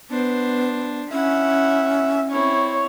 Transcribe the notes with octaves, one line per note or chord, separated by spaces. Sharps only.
B3 D4 C5
C#4 E4 E5 F#5
C4 E4 C#5